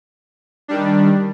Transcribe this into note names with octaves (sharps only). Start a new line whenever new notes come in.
D#3 G3 D4